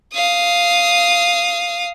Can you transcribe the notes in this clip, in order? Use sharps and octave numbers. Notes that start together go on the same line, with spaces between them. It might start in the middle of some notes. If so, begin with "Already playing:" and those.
F5 D#6